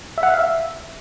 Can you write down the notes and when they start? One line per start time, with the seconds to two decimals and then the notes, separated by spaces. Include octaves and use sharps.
0.18 E5
0.23 F#5
0.28 E5
0.34 F5
0.39 E5